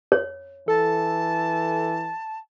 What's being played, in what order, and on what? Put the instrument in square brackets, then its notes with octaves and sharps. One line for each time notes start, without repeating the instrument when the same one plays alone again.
[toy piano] C#5
[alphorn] E3 [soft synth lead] A4 [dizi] A5